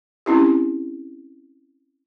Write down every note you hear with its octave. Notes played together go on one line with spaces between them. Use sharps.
C4 C#4 E4 G4